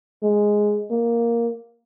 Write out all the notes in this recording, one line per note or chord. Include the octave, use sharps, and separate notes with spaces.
G#3
A#3